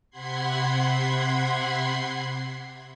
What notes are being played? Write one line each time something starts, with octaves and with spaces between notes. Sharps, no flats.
C3 F#5 B5 C6 G#6 C7